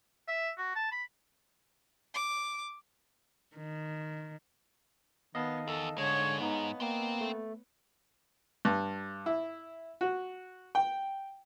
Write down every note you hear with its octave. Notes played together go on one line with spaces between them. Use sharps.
E5
F#4
A5
B5
D6
D#3
D#3 B3 D#5 F5 A5
E2 A4
G#2 D3 G#3 C#5
B3 D#4
A#3 C4 G5
A3
G2
E4
F#4
G5